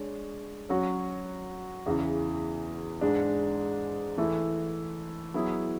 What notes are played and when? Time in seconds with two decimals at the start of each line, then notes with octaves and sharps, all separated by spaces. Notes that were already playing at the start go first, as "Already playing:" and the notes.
Already playing: G#3 D4 C#5
0.69 F#3 C#4 F#4 C#5
1.86 E2 C#3 E3
3.01 G#2 G#3 D4
4.18 E3 A3 E4
5.34 F#3 B3 E4 G#4